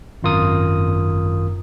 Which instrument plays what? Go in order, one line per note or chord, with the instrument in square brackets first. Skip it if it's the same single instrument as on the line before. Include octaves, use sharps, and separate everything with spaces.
[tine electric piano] G#1 F#2 F4 A#4 D#6